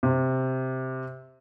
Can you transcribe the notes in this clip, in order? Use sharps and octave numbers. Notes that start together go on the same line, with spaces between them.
C3